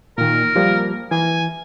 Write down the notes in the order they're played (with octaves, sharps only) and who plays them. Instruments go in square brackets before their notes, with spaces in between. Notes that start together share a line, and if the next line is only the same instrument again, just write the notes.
[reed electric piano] A#2 D#3 [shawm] A#4
[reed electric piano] F3 G3 A#3
[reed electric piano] E3 [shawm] G#5